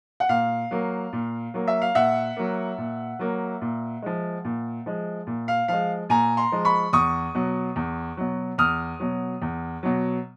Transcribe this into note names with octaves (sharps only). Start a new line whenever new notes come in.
F#5
A#2 F5
F#3 A#3
A#2
F#3 A#3
E5
F5
A#2 E5 F#5
F#3 A#3
A#2
F#3 A#3
A#2
F3 G#3
A#2
F3 G#3
A#2
F5
F3 G#3 F5
A#2 G#5 A#5
A#5 C6
F3 G#3
B5 C#6
E2 C#6 D#6
B2 F#3
E2
B2 F#3
E2 D#6 F6
B2 F#3
E2
B2 F#3